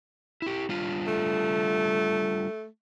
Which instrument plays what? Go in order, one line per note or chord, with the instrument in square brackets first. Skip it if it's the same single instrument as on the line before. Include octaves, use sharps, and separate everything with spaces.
[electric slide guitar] E4 G4
G3 D4 F4
[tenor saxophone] A3